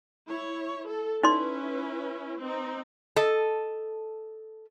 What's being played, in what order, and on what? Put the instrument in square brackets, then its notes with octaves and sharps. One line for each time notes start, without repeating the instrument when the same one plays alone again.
[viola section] E4 C#5
A4
[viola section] C#4 E4 B4 [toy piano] D#4 D5 C6
[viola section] C4 D#4
[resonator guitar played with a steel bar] A4 D#5